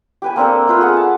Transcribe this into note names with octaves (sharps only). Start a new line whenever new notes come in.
G4 B4 G#5
A#3 C4 D4 A4
A3 F4 B4
G#4 F#5
A5